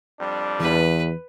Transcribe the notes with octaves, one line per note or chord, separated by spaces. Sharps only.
F2 G3 D4
E2 E3 B4